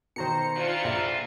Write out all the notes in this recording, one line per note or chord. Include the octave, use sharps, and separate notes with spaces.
B2 D#3 C5 A#5 C#7
E3 D4 F4
A#1 E5